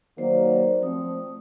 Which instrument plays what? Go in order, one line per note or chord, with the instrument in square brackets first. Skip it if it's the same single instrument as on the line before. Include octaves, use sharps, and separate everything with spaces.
[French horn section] D#3 F#3 A#3 [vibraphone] C5 D5
[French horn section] F3 C4 [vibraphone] A3 D#6